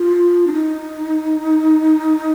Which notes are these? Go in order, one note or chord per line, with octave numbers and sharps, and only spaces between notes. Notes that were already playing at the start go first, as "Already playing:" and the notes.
Already playing: F4
D4
D#4